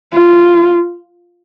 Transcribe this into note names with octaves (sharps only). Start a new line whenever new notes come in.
F4